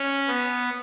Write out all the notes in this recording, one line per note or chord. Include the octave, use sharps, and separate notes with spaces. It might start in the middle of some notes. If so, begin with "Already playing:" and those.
Already playing: C#4
B3